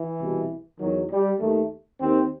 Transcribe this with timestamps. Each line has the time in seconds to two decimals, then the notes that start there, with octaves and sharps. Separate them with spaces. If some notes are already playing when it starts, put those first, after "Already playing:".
Already playing: E3
0.19 C2 B2
0.80 E2 D#3 F#3
1.10 G3
1.40 D#2 D#3 A3
2.00 D#2 D#3 C4